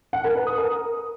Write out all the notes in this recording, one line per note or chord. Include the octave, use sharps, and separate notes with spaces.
F#5
A#4
B4
D#6
A#4